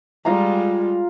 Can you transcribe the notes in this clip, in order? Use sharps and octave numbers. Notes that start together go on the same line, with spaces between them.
G3 G#3 F4 F5 A#5